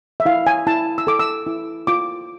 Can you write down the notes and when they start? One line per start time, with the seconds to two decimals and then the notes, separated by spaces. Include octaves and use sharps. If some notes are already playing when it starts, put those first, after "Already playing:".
0.20 E5
0.26 E4 F5
0.47 G#5
0.67 E4 A5
0.98 E6
1.07 A4 D6
1.19 E6
1.47 E4
1.87 F4 D6